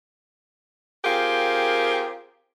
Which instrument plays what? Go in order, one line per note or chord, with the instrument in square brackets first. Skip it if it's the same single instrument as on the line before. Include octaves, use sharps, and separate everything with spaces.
[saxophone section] C4 F4 G4 G#4 A#4